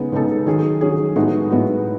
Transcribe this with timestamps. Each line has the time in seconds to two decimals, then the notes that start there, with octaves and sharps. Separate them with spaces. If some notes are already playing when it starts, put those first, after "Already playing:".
Already playing: C#3 G#3 B3 D#4
0.12 C#3 G#3 B3 D#4 A4
0.46 D#3 F#3 C#4 G#4
0.81 D#3 F#3 C#4 G#4
1.16 A2 G#3 B3 D#4 F#4
1.51 A2 G#3 B3 D#4 F#4